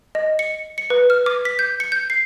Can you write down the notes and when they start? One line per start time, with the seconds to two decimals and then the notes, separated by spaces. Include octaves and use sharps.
0.15 D#5
0.39 C#7
0.78 C#7
0.90 B4
1.10 F6
1.26 D6
1.45 B6
1.59 G6
1.80 C#7
1.92 G6
2.10 C7